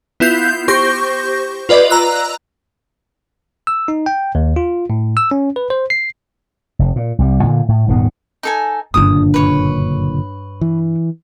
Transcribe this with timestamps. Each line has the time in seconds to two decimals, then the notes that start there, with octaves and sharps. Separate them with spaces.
0.20 B3 E4 F4 G6 C7
0.68 G4 C5 C#6 G6 A#6
1.69 F4 B4 D5 D#5
1.90 A#5 E6 F#6
3.67 E6
3.88 D#4
4.06 G5
4.35 D#2
4.56 F4
4.90 A2
5.17 E6
5.31 C#4
5.56 B4
5.70 C5
5.90 C7
6.79 F1
6.96 A#2
7.19 C2 G3
7.43 A#2 D3
7.69 A2
7.88 D#1 G#2 B2 B3
8.43 D#4 A4 G#5
8.94 F#1 G2 A#2 D3 D4 D#6
9.34 B4 C#5
10.61 E3